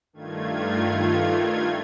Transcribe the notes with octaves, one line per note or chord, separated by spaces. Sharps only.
G2 D#3 A3 F4 G#6